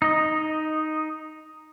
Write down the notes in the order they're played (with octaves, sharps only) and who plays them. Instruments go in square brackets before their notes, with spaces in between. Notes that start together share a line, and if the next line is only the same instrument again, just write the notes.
[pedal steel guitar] D#4 D#5